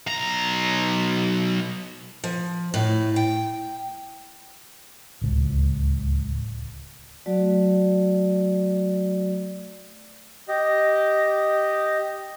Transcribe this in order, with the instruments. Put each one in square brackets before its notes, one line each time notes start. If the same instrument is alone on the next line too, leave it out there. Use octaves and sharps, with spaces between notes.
[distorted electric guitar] B1 A#5
[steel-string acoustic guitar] F3
A2
G5
[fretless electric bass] D1 C#2
[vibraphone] F#3 A3 F#4 D5
[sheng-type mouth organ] G4 D#5